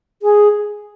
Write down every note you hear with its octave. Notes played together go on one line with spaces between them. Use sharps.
G#4